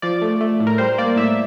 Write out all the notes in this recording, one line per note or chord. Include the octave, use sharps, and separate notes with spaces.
F3 D5
A3
A3
A2
A#4
G3 C5
A#3 D5
A2 E5